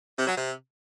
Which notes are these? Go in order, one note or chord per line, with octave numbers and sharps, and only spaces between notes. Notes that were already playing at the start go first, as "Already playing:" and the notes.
C3
F#3
C3